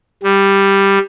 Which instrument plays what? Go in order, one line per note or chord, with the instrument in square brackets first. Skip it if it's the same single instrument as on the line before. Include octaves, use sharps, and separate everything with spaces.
[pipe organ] G3